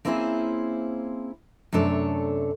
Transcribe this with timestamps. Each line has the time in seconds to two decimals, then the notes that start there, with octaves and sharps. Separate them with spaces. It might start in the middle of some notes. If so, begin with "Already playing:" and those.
0.05 A#3 C4 C#4 E4 G#4 C5
1.73 F#2 C3 A3 D4 A4 C#5